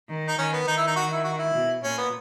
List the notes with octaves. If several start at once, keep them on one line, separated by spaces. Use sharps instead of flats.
D#3
D#4
D#3 C#4
B3
D#3 D#4
E4
D#4
F#4
E4
F#4
E4
B2
A#2 C#4
B3